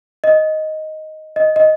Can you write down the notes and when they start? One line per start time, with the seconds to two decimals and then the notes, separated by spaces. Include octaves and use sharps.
0.24 D#5
1.36 D#5
1.56 D#5